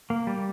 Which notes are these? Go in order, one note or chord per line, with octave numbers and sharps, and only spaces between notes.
A#3
G3